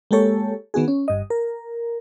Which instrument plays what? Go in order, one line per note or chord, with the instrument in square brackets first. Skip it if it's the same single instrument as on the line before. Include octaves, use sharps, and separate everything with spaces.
[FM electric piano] G#3 A#3 G4 A4 C#5
D#3 B3 F#4 G#4
C#4
G1 G2 D#5
A#4